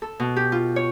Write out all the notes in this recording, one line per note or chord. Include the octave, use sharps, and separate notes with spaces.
A4
B2
G4
F4
C#5